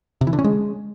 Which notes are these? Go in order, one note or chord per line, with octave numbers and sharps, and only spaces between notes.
C3
E3
D3
C#4
G#3